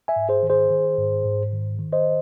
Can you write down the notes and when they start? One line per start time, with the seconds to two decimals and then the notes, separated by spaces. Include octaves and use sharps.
0.08 E5 G#5
0.16 G#2
0.29 G#4 C5
0.43 D#3
0.50 G#4 C5
0.70 D#3
0.98 G#2
1.25 G#2
1.53 D#3
1.79 D#3
1.93 C5 D#5